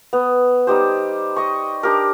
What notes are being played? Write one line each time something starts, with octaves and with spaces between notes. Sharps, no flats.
B3
G3 D#4 G4 C5
D#5 C#6
D4 G4 A#4